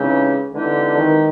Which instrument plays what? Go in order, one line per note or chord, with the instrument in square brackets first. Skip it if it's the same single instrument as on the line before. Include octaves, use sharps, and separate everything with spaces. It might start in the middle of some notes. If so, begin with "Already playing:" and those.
Already playing: [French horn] C#3 [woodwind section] E3 G#3 C4 D#4 G4
[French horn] D3 [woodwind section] E3 G#3 C4 D#4 G4
[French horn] D#3